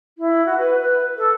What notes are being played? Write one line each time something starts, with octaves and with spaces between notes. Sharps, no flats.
E4
F#4
B4
B4
A4